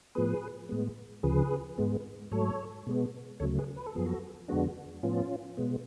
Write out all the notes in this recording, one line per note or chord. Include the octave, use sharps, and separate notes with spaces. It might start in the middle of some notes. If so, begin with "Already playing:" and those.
A2 F3 B3 G#4 B4
A2 G#3 B3
D2 C#3 F3 G#4 B4
G#2 G#3 B3
G#2 F#3 A3 A4 C#5
B2 G#3 B3
D2 C#3 F#3 A3 A4 C#5
G#4 B4
B4
A4
F#2 F3 B3 G#4
F#4 A4
F2 D3 G#3 B3 D4 F#4
A2 F3 B3 C#4 F4
B2 G#3 B3